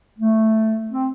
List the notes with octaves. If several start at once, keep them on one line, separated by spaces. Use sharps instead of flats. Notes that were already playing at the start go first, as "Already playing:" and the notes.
A3
C4